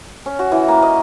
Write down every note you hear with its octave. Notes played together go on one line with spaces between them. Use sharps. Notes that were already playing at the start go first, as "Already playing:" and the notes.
C#4
F#4
E3
A#3
D#5